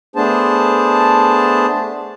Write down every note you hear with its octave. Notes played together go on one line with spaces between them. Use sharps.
A3 B3 D4 G#4 C5 A5